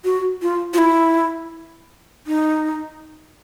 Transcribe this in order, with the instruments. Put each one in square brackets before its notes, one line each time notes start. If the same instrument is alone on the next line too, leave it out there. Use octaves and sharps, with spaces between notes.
[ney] F#4
F4
F4
E4
D#4